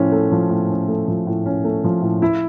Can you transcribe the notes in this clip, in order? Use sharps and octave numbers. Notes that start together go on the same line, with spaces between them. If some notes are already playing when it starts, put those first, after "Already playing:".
Already playing: A2 F3 C#4
A3
F3
A2
C#4
A3
F3
A2
C#4
A3
F3
A2
E4